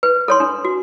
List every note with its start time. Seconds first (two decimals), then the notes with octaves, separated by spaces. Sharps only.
0.03 B4
0.28 A4 C#5 C6
0.40 D4
0.65 F#4